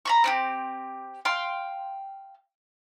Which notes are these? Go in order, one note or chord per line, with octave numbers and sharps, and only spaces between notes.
A#5 B5 C#6
C4 D4 G4
F5 G5 C6